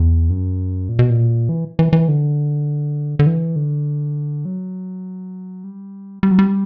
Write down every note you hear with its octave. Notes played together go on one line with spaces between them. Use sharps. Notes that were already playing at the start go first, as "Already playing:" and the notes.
Already playing: E2
F#2
A#2
B2
A#2
E3
E3
E3
D3
D3
E3
D3
F#3
G3
G3
F#3
G3